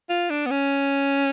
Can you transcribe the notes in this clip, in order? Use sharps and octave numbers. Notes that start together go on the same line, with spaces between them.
F4
D4
B3
C#4